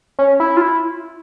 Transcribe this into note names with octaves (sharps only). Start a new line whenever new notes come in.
C#4
E4
F4
E4